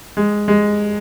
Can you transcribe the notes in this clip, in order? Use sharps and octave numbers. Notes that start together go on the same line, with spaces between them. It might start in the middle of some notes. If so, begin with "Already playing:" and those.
G#3
G#3